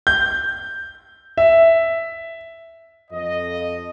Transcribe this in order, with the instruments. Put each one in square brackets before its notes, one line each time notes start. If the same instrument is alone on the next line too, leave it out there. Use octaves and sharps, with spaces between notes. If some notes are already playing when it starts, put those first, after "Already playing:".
[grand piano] G6
E5
[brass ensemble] F2 D#5